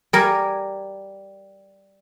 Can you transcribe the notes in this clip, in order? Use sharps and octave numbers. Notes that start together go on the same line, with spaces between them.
G3 A#4 G#5